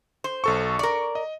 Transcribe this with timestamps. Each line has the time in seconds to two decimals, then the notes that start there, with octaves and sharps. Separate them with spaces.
0.24 C5
0.44 B1 A4 C#6
0.79 A#4 D5 C#6
1.15 D#5